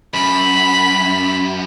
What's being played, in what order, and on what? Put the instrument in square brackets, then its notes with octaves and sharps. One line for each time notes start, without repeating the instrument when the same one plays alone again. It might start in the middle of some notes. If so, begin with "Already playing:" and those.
[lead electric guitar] F#2 [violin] B5